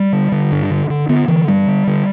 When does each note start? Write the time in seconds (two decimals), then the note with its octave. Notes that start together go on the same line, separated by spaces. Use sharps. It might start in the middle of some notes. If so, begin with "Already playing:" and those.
Already playing: G3
0.13 D3
0.32 D3
0.52 G2
0.71 D3
0.90 D3
1.09 D3 B3
1.28 D3 E3
1.48 G2 G3
1.68 D3
1.87 D3